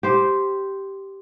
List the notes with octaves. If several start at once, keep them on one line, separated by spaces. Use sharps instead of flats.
G4 C5